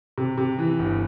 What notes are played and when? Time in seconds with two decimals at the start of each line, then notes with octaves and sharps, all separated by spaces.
0.18 C3
0.38 C3
0.59 E3
0.79 G1